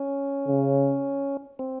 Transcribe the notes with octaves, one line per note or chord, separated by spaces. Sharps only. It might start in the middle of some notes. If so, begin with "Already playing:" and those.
Already playing: C#4
C#3
C4